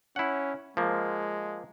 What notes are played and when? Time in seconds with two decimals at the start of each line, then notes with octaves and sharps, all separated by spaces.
0.16 C#4 E4 F#5
0.77 F3 G#3 A#3